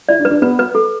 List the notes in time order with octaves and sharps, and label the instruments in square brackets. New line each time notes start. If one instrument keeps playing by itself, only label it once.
[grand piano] E4 [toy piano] D5
[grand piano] D4
[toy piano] B4
[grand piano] D4
[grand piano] B3 [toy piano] B4
[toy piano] B4
A4